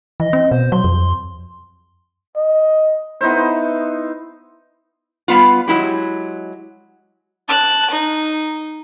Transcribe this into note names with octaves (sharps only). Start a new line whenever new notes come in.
E3 D#5
C4
B2 C5
F#3 C6
F2
D#5
B3 D#4 E4 C5
G3 B3 F4
F#3 G#3 E4 G4
A5 F#6
D#4